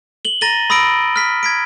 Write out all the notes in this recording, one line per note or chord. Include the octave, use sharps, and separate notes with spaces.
F#7 G7
A#5 A6 A#6 D#7 F#7 G7
B5 D#6 E6 A#6 D7
F6 B6
G#6 B6 D7